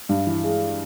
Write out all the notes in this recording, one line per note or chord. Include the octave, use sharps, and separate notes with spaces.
G2
E3
G#3